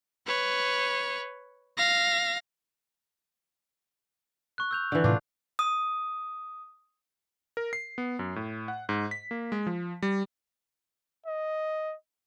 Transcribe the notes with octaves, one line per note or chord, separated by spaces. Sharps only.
B4 C#5
F5 A#6
C#6 F#6
E6 G6 F7
D3 E3
A2 C3 D4 F4
D#6
A#4
C7
B3
F#2
A2
F#5
G#2
B6
A#3
G#3
F3
G3
D#5